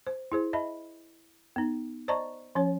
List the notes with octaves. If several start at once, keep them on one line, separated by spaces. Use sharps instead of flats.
C5
E4 G#4 C5
D#5 E5 A5 B5
B3 D#4
C5 D5 D#5 A5 A#5 C#6
F3 C#4 C#5